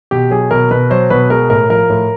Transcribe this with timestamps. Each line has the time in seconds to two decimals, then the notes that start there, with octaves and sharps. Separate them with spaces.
0.11 B2 G4
0.31 F#3 G#4
0.51 B2 A#4
0.71 B2 B4
0.90 F#3 C5
1.10 B2 B4
1.30 G#3 A#4
1.50 A2 A#4
1.70 F3 A#4
1.90 A2